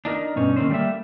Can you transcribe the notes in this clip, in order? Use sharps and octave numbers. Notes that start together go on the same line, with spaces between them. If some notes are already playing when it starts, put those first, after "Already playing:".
D4 D#4 A#4
G2 B2 C#4 D#4
D#3 A#3 C4 C#4 C5
G3 A3 A#3 E5